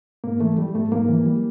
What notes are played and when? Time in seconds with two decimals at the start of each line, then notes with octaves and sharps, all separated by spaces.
0.24 G#2 A#3
0.41 E3 A3
0.58 G3
0.74 G#2 A3
0.92 G#2 A#3
1.09 E3
1.26 G3